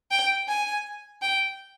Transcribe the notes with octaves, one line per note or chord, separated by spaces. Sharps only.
G5
G#5
G5